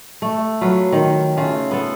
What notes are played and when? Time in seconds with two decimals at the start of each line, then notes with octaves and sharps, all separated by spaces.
0.22 A3
0.61 F#3 F4 B4
0.92 D#3
1.37 C#3 A3 F4
1.71 B3 A4